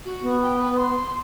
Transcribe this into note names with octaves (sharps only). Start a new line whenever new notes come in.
F#4
B3
G5
B4
C6